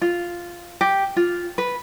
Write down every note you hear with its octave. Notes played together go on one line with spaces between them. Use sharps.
F4
G4
F4
B4